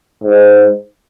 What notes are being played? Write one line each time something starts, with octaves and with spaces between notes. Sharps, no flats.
G#2